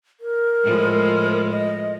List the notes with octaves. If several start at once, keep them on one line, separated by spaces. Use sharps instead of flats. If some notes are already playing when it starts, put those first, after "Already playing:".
A#4
A2 F3 G#3
D#5